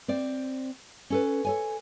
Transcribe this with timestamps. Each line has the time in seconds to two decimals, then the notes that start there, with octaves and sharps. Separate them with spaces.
0.08 C4 C5 D5
1.10 C#4 A4 B4
1.45 A4 C#5 G#5